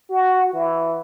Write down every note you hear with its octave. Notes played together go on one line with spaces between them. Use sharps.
F#4
E3